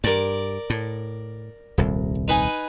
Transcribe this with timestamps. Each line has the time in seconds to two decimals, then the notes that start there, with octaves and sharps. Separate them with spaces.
0.04 G2 A#4 D5
0.70 A2
1.78 D#1 C2
2.28 D#4 B4 G#5